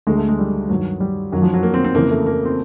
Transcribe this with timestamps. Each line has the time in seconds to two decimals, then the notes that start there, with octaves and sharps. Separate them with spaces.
0.07 D2 D3 G#3
0.17 A3
0.28 G#3
0.39 G3
0.69 G2 D#3 F#3
1.00 G3
1.32 F#2 D#3 F#3
1.42 F3
1.54 F#3
1.63 A#3
1.74 C4
1.84 C4
1.95 F2 C#3 E3 A#3
2.11 A3
2.26 A#3
2.45 C4